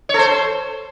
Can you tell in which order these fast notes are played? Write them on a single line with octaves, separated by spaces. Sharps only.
C#5 A4 C5